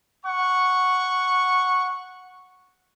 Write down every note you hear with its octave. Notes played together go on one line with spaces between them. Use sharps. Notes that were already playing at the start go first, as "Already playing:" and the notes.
F#5 C#6